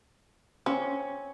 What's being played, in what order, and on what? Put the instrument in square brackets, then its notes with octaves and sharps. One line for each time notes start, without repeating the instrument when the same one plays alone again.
[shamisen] C4 [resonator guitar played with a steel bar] C#4